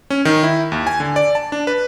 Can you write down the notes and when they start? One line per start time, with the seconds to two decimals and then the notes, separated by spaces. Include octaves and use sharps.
0.10 C#4
0.25 D#3
0.43 E4
0.72 D#2
0.87 G#5
1.00 D3
1.16 D5
1.35 A5
1.52 D4
1.67 B4